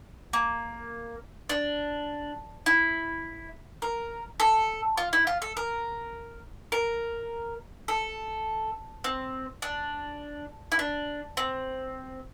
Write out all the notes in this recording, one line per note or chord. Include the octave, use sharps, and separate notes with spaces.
A#3
D4
E4
A#4
A4
F4
E4
F4
A4
A#4
A#4
A4
C4
D4
E4
D4
C4